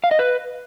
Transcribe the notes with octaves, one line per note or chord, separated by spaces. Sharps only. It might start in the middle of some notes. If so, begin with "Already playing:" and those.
F5
D#5
B4